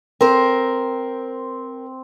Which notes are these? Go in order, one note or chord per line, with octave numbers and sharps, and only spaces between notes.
C4 A#4 C5